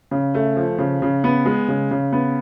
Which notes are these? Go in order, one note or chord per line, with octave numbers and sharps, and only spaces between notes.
C#3
A3
F3
C#3
C#3
B3
G#3
C#3
C#3
B3